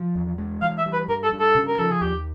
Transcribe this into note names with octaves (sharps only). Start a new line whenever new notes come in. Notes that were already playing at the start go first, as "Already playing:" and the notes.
Already playing: F3
E2
G#3
E3 F5
E5
G3
B4
G2 A#4
A4
G2
A4
C#3
A#4
F3 A4
G#4
D#2 G4